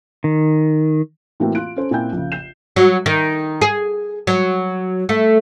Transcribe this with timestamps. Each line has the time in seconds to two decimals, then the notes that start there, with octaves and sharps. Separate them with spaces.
0.24 D#3
1.40 A2 E3 A3 A#3 C4 F#4
1.55 F4 F#6 D7
1.76 C#4 A4 C5
1.91 A#2 C4 E4 G#5 G6
2.13 A#1 C#3
2.32 G6 C7 E7
2.76 F#3
3.06 D#3
3.61 G#4
4.27 F#3
5.09 A3